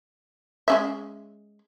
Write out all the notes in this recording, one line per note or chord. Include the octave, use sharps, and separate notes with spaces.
G#3 C#4 E5